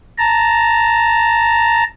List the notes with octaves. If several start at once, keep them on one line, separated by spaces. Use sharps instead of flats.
A5 A#5